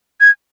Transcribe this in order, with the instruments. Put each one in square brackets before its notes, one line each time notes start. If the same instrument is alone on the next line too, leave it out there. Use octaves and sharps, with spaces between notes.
[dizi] G#6